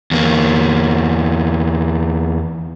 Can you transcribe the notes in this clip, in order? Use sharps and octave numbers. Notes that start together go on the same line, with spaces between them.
E2 A#3